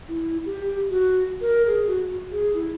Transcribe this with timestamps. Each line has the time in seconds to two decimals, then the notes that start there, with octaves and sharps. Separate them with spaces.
0.09 E4
0.46 G4
0.90 F#4
1.41 A#4
1.67 G#4
1.87 F#4
2.31 G#4
2.54 E4